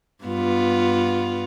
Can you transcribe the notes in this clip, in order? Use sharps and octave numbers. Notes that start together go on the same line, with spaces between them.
G2 B3 F4